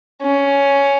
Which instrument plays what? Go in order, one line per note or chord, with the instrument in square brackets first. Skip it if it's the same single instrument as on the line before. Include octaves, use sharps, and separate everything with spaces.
[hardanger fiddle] C#4